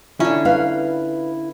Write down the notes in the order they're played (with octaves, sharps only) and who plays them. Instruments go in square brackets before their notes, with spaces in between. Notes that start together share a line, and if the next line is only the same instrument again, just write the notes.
[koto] D3 C#4 [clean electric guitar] E4 [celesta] F4
[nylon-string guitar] B4 F5